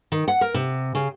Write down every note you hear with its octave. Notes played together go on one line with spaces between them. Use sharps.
D#3
F#5
A#4
C3
C#3